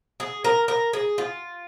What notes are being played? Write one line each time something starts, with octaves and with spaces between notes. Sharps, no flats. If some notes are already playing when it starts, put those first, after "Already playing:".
G#4
A#4
A#4
G#4
F4